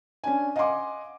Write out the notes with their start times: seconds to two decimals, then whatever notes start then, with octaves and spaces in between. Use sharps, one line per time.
0.24 C#4 D4 G#5
0.56 D#5 F5 F#5 G#5 C6 D6